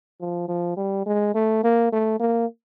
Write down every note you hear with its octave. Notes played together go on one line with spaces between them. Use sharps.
F3
F3
G3
G#3
A3
A#3
A3
A#3